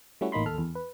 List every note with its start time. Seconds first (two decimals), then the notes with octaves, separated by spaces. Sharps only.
0.21 G3 A3 C#4 E4 F#4
0.32 A1 A#3 D#4 B5 C6
0.46 D#2 A4 F6
0.58 E2
0.75 B4